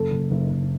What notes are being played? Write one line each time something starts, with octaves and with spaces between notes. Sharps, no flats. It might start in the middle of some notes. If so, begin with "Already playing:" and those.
Already playing: F#1 A4
F#1
F#1
F#1